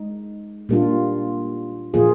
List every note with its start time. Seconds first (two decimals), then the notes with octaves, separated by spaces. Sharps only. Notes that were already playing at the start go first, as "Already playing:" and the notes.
Already playing: G#3 D#4
0.69 A#2 G3 A#3 D4 F4
1.94 A#2 F3 A#3 F4 G#4